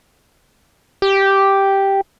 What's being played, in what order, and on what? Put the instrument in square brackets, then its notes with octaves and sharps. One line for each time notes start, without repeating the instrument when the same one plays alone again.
[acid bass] G4